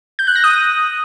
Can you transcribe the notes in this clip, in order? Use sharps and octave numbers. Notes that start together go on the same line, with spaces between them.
G6
F#6
A#6
D#6